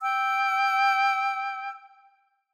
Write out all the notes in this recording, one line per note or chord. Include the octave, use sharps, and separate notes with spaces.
G5 E6